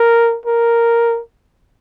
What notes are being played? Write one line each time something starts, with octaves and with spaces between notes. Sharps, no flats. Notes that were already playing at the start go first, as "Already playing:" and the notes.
Already playing: A#4
A#4